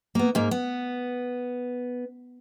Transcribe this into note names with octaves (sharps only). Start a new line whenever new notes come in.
A#3 B3
G#2 A#3
B3